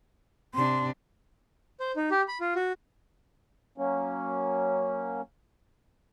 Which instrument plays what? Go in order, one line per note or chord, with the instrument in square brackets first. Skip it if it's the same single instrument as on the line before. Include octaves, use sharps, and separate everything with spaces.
[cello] C3 D4 [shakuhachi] C6
[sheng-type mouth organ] C5
D#4
G4
B5
F4
F#4
[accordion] F#3 A#3 C#4